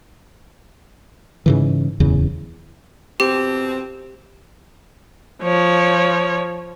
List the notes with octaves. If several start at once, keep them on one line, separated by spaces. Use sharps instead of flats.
G#2 C#3 E3
D1 E2 C#3
F2 B2 C4 G4
F3 C#5